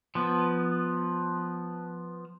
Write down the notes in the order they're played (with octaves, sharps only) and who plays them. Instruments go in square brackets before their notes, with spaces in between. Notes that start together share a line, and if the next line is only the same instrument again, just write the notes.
[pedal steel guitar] F3 B3